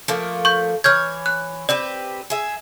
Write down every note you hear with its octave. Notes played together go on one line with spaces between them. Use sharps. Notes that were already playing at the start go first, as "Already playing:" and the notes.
F3 A3 A#3
C#6 G6
E3 C#5 F6 G6 G#6
F#6
C4 G4 B4 D5
G#4 E5